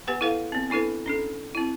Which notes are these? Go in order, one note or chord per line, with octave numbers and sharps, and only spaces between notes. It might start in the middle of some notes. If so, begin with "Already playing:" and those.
B3 G4 B4 F#5
E4 A4 B4 F5
B3 C4
B3 D4 E4 A4 B4
C#4 D4 A4
C4 E4